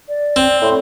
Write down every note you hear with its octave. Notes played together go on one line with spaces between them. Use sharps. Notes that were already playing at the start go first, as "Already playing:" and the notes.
D5
C4
A2 C6